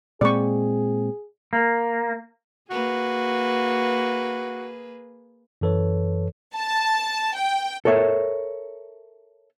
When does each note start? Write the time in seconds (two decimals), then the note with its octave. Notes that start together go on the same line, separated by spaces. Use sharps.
0.21 A#2 G#3 C4 G#4 D5 C#6
1.53 A#3
2.70 A#3 F#4 G#4 B4
5.61 F#2 E3 A4 B4 C#5
6.56 A5
7.36 G5
7.85 A4 A#4 C#5 E5